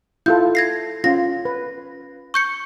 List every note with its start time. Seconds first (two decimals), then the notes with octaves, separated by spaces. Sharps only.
0.26 E4 F4 A4 G6
0.55 G#6 A#6 C7
1.04 C#4 F4 A#6
1.45 B4
2.34 C#6 G6 C#7